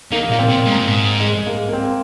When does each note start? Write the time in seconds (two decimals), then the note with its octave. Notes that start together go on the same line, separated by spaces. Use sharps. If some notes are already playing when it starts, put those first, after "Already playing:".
0.12 D#3 A#3
0.31 A#2 A#3
0.39 C4
0.48 A#2
0.65 G#2
0.75 A#2
0.85 G#2
1.20 G#3
1.39 G#3
1.47 A#3
1.68 A#3
1.73 C4